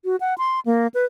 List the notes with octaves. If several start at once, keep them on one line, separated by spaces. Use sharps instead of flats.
F#4
F#5
C6
A#3
B4